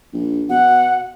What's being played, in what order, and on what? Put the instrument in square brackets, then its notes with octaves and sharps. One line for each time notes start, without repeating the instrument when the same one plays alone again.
[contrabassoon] A#1
[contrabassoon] B2 [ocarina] F#5